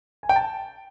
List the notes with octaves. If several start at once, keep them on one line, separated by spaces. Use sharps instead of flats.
G#5
G5
A5